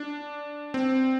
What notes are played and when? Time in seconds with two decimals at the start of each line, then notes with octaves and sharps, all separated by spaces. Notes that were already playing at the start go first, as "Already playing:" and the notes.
Already playing: D4
0.74 C4